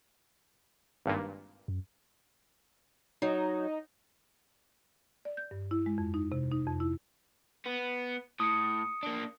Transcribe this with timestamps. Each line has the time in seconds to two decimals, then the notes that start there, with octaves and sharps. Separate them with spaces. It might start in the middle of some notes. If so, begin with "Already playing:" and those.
1.05 G#1 G2 A#2
1.68 F#2
3.22 F#3 D#4
5.25 D5
5.37 G6
5.51 G2
5.71 E4
5.86 G#3
5.98 F2
6.14 D#4
6.32 C3
6.52 D#4
6.67 F2
6.80 E4
7.66 B3
8.40 A2 D#6 C#7
9.03 A#3 D4